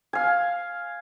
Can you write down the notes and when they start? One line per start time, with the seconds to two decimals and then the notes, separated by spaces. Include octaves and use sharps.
0.13 F5 G#5